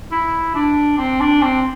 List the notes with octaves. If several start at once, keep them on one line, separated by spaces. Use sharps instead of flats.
E4
D4
C4
D4
C4